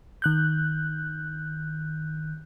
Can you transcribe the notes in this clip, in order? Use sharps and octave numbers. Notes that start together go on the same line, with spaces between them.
D#3 F#6 G6